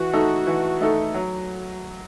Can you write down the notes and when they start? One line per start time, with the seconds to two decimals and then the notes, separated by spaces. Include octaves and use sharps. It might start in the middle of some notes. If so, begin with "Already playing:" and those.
Already playing: E3 F#4
0.13 A3 D#4 A4
0.47 E3
0.81 A3 D#4 A4
1.14 F#3